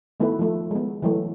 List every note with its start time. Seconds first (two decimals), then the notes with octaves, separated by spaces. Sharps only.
0.20 D#3 A3 B3 E4 F#4 B4
0.39 F3 A3
0.71 G#3 B3
1.02 E3 F#3 A3